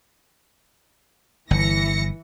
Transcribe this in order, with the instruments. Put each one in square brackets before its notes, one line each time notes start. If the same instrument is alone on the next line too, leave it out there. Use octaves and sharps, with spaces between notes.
[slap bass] G1 [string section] E3 A#6 C#7